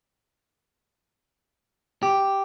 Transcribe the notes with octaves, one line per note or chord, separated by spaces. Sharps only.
G4